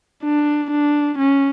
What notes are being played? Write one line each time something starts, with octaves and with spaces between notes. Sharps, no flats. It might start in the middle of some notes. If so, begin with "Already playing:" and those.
D4
D4
C#4